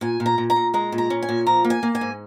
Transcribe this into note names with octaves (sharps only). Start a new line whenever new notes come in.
A#2 G#5
A#2
A#5
A#2
A#5
A#2
G#3 A#5
A#2
A#5
C#4
G#5
A#2
F3 A#5
A#3
G#5
A#3
G#5
G#2